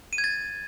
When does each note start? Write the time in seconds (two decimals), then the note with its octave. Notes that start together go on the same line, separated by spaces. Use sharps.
0.13 D#7
0.18 G#6
0.24 A6